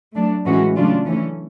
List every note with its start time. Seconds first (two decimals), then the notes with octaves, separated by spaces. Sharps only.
0.15 F#3 A3 D4
0.45 A2 E3 G#3 C#4 F#4
0.76 C#3 F#3 A3 D4 F4
1.06 E3 A3 C#4